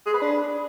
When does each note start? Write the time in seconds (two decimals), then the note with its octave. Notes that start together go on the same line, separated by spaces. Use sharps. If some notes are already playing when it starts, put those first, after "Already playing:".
0.06 G#4
0.14 B4
0.22 D4